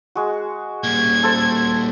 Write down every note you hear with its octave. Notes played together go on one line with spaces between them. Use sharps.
G#3 F#4
A#2 G3 G#6
A4 C5 A5